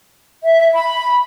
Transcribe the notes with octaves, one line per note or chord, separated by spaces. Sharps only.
E5
B5